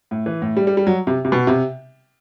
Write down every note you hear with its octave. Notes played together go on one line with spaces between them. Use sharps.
A2
E3
A2
G3
G3
G3
F#3
C3
C3
B2
C3